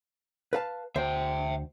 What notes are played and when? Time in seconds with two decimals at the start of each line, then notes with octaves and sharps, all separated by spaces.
0.53 B4 F5 A5
0.96 D2 C5 E5 G5